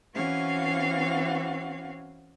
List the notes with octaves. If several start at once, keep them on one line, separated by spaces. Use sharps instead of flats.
E3 C4 C#4 F#4 F5